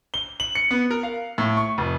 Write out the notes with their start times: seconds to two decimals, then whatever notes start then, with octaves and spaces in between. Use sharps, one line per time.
0.14 G7
0.40 F#7
0.55 C#7
0.71 B3
0.91 A#4
1.03 F5
1.38 A2
1.57 C#6
1.78 F1